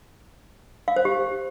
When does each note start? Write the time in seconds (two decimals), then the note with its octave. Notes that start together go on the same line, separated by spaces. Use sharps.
0.88 F5
0.96 C5
1.05 G4